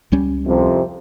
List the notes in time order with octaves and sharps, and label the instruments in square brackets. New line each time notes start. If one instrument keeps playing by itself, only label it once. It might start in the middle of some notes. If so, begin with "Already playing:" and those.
[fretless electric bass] C#2 G3 C#4
[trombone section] C2 F2 C3